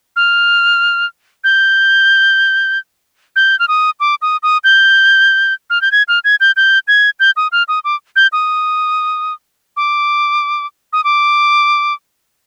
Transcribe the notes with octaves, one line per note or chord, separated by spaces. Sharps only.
F6
G6
G6
F6
D#6
D6
D#6
D#6
G6
F6
G6
G#6
F6
G#6
G6
G6
G#6
G6
D#6
F6
D#6
D6
G6
D#6
D6
D#6
D6